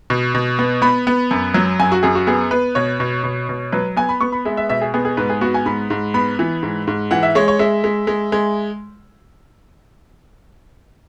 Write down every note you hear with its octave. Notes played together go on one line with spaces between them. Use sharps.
B2
B2
B3
B3 B5
B3
F#2
F#3
F#2 G#5
F#4
F#2 G#4
F#4
B3 G#4
B3 B4
B2 C#5
B2
B2
B2
F#3 B4
B3 G#5
B5
B3 C#6
B5
G#3 E5
E5
B2 E5
G#4
B3 G#4
G#4
G#2 B4
G#4
B3 F#4
G#5
G#2 B5
G#2
B3 B5
E3
G#2
G#2
E3 F#5
E5
G#3 C#5
C#5
G#3 E5
G#3
G#3
G#3